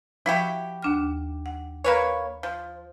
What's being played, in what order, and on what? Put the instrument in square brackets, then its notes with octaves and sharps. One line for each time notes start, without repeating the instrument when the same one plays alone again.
[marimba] F3 [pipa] E4 F#4 G4
[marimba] D#2 D4 F6
F#5
[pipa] A#3 B4 C#5
F3